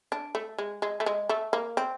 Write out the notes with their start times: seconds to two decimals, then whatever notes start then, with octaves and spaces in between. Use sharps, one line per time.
0.12 D4
0.35 A3
0.58 G#3
0.82 G#3
1.00 A3
1.06 G#3
1.29 A3
1.53 A#3
1.77 C4